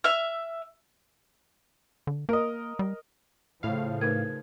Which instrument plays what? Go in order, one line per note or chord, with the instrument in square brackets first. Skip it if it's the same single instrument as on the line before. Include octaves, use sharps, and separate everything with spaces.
[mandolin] E5 F6
[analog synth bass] D3
[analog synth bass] A#3 [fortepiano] A#4 D#5
[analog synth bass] G3
[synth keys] A2 F5 [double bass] C#3 F3
[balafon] A3 D#4 B4 [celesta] A#4 G#6